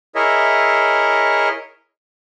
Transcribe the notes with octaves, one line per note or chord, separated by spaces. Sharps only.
E4 G#4 A#4 C#5 D#5 E5